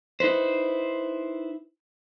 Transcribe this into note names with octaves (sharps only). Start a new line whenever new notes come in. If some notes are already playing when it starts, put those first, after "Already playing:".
D#4 E4 B4 C5